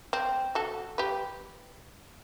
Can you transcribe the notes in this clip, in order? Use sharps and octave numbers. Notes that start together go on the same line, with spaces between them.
C4
F#4 A4
G4 B4